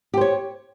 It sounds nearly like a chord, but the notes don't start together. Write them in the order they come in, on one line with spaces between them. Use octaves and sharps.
G4 C5 C#5